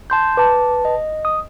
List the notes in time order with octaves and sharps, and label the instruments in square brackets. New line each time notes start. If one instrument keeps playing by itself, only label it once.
[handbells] A5 C6 G6
[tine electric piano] B4 A5 [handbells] D6
[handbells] D#5
[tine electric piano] D#6